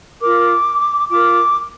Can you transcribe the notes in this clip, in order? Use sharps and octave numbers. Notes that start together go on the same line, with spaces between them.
F4 A#4 D6
F4 A#4 D6